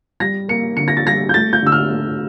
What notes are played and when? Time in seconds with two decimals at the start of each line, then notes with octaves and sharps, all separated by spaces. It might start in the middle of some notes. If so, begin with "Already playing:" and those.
0.20 G3 A#6
0.49 A#3 C#7
0.77 D3 C#7
0.88 A#6
0.97 A6
1.06 G3 A#6
1.29 G6
1.34 A3 A6
1.53 G6
1.63 D3 E6
1.72 F6
1.91 A3